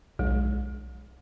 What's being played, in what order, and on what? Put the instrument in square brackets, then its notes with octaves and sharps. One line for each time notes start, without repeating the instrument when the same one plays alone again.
[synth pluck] B1 [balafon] G#3